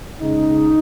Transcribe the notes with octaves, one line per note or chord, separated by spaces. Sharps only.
C#3 G#3 D#4